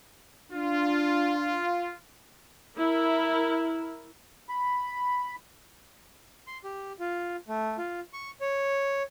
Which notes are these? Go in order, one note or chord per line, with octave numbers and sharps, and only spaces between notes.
D4 F4
E4 A#4
B5
C6
G4
F4
A3
F4
C#6
C#5